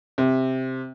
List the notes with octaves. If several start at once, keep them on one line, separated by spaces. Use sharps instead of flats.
C3